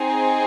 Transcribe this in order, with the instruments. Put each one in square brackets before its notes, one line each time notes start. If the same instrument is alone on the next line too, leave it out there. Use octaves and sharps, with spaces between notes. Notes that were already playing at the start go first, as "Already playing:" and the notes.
Already playing: [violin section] C4 D#4 G#4